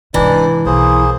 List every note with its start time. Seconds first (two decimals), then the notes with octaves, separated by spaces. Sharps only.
0.14 G#2 C3 E3 D4 D#4 D5
0.66 B1 A#3 F4 G#4 C5